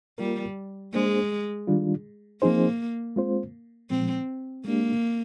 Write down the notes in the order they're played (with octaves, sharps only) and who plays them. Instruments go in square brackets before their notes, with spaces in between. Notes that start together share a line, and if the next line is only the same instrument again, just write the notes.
[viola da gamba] G3 [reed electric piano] A#3 F4 A#4
[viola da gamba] G#3 [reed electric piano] A#3 D4 G#4 C5
[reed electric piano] D#3 G3 D4 F4
[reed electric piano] F3 C4 D#4 G#4 C5 [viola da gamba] A#3
[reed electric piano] G#3 C4 F4 C5
[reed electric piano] A#2 F3 G#3 [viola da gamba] C4
[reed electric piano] G#3 D4 G4 [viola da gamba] A#3